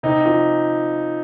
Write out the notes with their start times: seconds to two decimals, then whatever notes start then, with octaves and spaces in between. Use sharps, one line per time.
0.03 C3 D#4
0.25 F3